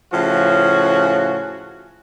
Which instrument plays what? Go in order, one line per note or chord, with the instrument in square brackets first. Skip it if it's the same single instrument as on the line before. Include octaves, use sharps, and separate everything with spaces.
[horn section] A2 C#3 F3 C#4 F#4